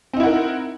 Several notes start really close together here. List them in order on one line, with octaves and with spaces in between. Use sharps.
C4 D#4 E4 F#5 A#4